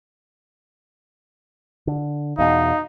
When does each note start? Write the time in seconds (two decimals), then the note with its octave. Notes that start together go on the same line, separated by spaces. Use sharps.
1.87 D3
2.38 E2 B2 D#4 F5